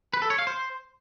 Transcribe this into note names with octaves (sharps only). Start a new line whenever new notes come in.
B4
A4
C#5
F5
C5